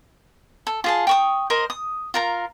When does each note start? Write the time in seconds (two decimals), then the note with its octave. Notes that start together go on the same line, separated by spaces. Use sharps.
0.67 A4
0.84 F4 G#4 A5
1.07 G5 C#6 D#6
1.50 A#4 C5 D#5
1.70 D#6
2.14 F4 A#4 A#5